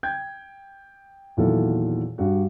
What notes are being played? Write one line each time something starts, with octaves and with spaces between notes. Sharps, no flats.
G5 G6 G#6
E2 A#2 D#3 F#3 E4 A4
G2 G3 F#4